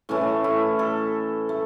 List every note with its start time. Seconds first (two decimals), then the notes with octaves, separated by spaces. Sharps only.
0.09 A2 E3 A3 C#4
0.44 E4
0.79 A4
1.49 A3